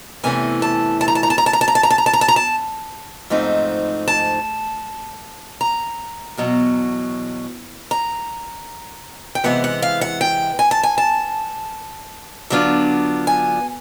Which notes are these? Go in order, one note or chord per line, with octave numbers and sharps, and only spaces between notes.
E2 C3 E3 A3 C#4 G#5
A5
A5
A#5
A5
A#5
A5
A#5
A5
A#5
A5
A#5
A5
A#5
A5
A#5
A5
A#5
A5
A#5
A5
G#2 F3 A3 C4 D#4
A5
A#5
E2 B2 F#3
A#5
G5
C3 E3 G#3 B3 F#5
F#5
F5
F#5
G5
G#5
A5
G#5
A5
D3 F#3 B3 D4 F4
G#5